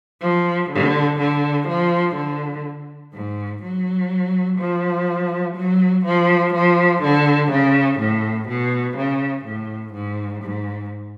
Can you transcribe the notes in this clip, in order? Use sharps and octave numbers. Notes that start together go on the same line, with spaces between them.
F3
D3
D3
F3
D3
G#2
F#3
F3
F#3
F3
F3
D3
C#3
A2
B2
C#3
A2
G#2
G#2